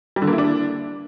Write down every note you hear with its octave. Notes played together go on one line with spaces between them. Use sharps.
G3
D3
A#3
E4
D4